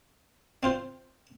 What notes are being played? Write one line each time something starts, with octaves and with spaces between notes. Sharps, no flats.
C4 F4 C5